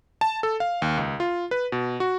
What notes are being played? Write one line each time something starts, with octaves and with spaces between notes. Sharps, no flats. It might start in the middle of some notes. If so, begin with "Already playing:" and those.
A5
A4
F5
D#2
C#2
F4
B4
B2
F#4